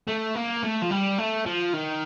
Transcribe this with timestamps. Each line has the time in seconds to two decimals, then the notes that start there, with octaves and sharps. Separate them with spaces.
0.08 A3
0.35 A#3
0.63 A3
0.82 F3
0.91 G3
1.18 A3
1.46 F3
1.73 D#3